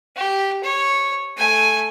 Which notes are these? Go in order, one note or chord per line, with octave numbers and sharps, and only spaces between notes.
G4
C#5
A3 G#5